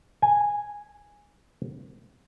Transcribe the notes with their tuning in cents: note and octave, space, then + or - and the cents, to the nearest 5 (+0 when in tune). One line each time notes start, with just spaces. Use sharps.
G#5 -5